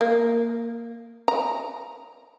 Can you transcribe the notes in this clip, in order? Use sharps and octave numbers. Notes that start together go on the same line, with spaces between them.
A#3
A#5